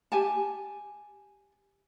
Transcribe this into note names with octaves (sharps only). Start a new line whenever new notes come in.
G4 G#5 A5